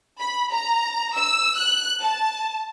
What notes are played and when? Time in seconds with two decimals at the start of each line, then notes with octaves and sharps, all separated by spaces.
0.20 B5
0.52 A#5
1.15 E6
1.58 F#6
2.01 A5